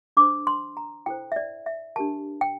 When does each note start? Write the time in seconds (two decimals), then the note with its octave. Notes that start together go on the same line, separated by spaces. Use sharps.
0.17 D4 A4 C5 D6
0.47 C6
0.77 A#5
1.06 E4 A4 C5 G5
1.32 E5
1.36 D5
1.66 E5
1.96 D4 G4 A#4 A5
2.41 G5